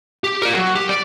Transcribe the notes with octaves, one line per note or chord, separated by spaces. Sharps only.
G4
A#4 D5
F#3
G4
D5